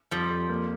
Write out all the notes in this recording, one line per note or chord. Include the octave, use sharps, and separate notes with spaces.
F2 F3 G3
F2
A#3